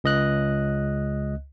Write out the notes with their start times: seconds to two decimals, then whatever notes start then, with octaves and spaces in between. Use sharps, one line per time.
0.04 C#2 D#5 F#6